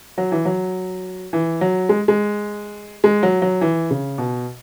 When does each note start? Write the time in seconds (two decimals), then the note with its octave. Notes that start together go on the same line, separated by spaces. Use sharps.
0.18 F#3
0.32 E3
0.45 F#3
1.33 E3
1.61 F#3
1.89 G#3
2.08 G#3
3.04 G#3
3.23 F#3
3.42 F#3
3.61 E3
3.90 C#3
4.18 B2